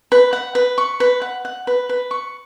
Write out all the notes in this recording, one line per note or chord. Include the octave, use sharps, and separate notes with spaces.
B4
F#5
B4
C#6
B4
F#5
F#5
B4
B4
C#6